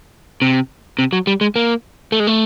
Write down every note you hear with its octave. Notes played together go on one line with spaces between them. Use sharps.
C3
C3
F#3
G3
G#3
A#3
A3
G#3
A3